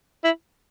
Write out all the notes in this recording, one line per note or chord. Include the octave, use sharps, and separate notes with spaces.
E4